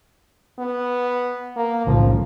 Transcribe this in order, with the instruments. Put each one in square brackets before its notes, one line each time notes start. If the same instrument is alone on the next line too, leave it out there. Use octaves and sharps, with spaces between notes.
[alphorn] B3
A#3
[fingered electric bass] B1 A2 C#3 [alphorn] F3